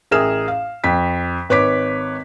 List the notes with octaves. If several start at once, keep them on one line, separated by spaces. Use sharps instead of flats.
A1 G#4 A#4 E5 F6 E7
F5
F2 B6
G#1 B4 C#5 D6 B6